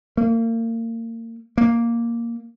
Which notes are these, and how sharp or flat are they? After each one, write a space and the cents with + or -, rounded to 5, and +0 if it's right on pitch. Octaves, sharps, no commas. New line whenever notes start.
A#3 -35
A#3 +0